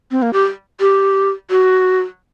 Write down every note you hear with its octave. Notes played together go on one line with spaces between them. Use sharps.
C4
A#3
G4
G4
F#4